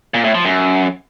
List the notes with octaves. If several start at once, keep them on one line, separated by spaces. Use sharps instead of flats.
A#2
A2
F3
F#2